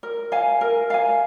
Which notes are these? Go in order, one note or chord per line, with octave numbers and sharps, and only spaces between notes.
A#4
F5 G#5
A#4
F5 G#5